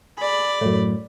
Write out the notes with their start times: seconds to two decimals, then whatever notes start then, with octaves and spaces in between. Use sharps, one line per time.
0.18 G#4 D5 B5
0.61 F#2 A2